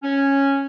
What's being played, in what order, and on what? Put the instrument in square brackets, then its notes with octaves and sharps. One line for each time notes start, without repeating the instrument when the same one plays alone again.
[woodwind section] C#4